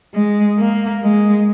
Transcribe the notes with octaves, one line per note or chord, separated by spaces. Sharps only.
G#3
A#3
G#3